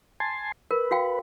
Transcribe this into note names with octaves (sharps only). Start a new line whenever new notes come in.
G#5 A5 C6
A#4 B4
F#4 F5 G5